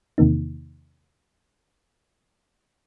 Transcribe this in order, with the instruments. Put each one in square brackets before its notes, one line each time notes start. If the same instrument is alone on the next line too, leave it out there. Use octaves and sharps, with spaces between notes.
[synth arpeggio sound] E2 C3 D#3 A#3 D#4